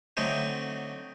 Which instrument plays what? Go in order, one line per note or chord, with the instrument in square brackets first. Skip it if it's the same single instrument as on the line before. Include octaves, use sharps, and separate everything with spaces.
[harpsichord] D3 F#3 A3 C4 D#4